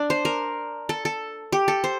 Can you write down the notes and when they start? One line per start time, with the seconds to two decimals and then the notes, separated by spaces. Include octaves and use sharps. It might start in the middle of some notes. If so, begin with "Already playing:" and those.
Already playing: D4
0.10 C5
0.25 A#4
0.89 A4
1.05 A4
1.52 G4
1.68 A4
1.84 C5